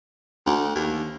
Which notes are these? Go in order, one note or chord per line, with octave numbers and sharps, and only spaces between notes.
D2
D#2